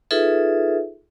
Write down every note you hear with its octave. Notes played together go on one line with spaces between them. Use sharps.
D#4 F4 G#4 A4 B4 E5